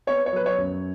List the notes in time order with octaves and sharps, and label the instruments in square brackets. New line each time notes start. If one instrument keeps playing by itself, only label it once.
[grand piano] B3 C#5
C#5
F#3 B4
C#5
F#2